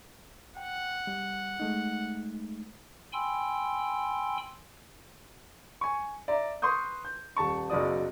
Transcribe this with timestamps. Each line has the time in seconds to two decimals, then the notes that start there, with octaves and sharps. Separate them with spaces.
0.57 F#5 G5
1.07 G3
1.60 G#3 A3 D#4
3.13 G5 G#5 B5 C6 E6
5.81 G#5 C#6
6.28 D5 E5 A#5
6.62 B4 C6 C#6 D#6 G6
7.05 G6
7.36 D#1 A5 C#6
7.70 F#1 B1 F#3 F#4 D5 D#6